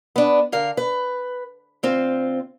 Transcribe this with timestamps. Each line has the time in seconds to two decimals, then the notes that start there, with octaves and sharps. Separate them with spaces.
0.16 B3 D4
0.52 D3 A#4 F5
0.77 B4
1.83 D2 C4 F4